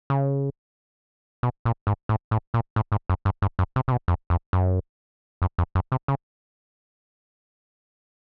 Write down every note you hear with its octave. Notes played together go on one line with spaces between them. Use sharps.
C#3
B2
A#2
G#2
A2
A2
A#2
A2
G#2
F#2
G2
G2
F#2
C3
C3
B2
F2
F2
F#2
F#2
F2
F#2
C3
C#3